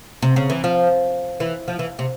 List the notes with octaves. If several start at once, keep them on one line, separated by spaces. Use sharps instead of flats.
C3
C#3
E3
F3
E3
F3
E3
C3